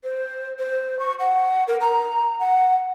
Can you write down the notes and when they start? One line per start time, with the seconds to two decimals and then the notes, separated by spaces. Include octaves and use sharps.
0.04 C5
0.59 C5
0.99 C#6
1.19 F#5
1.68 A#4
1.81 A#5
2.40 F#5